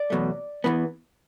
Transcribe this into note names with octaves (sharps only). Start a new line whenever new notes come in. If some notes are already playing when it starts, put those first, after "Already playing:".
Already playing: D5
E2 B2 F#3 A3
E2 E3 B3